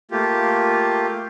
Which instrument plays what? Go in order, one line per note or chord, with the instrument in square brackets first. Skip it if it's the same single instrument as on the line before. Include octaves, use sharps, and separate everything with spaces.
[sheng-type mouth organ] A3 A#3 F4 G4